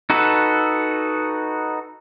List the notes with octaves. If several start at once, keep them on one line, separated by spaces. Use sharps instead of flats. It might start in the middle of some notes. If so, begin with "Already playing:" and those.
D#4 F#4 A4 B4